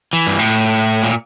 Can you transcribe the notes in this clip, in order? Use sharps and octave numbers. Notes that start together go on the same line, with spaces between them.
E3
G2
A2
A#2